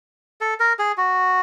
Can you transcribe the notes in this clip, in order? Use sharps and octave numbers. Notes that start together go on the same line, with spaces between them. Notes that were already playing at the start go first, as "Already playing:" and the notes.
A4
A#4
G#4
F#4